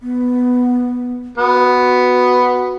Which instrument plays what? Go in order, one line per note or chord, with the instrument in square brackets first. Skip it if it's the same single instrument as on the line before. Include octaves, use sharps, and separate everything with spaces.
[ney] B3
[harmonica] B3 [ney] F#4